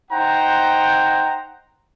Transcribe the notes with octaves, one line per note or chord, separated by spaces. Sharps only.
D#4 C5 F#5 G5 A#5